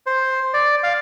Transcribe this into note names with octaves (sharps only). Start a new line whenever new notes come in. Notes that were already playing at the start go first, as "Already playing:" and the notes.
C5
D5
F5